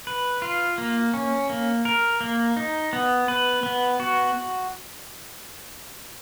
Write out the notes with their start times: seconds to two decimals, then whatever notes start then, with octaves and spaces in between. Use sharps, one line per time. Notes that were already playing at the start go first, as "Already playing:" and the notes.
0.07 B4
0.42 F4
0.78 A#3
1.14 C#4
1.50 A#3
1.85 A#4
2.21 A#3
2.57 D#4
2.93 B3
3.28 B4
3.63 B3
4.00 F#4